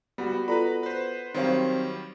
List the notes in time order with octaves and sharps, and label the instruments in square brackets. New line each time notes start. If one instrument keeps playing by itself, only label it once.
[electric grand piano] G3 [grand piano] B3 F#4
[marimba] F4 A4 D5 [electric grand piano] B4 A#5 B5
[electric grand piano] B4 C5
[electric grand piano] D#3 F#3 G3 [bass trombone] C4 [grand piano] C5 C#5 F5